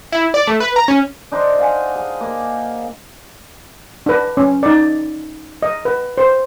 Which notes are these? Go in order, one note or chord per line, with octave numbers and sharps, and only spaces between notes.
E4
D5
A3
B4
A#5
C#4
D4 D#4 C5 C6
F5 F#5 G#5
G#4
A#3
D4 B4
C#4
D#4 D5
D#5
B4
C5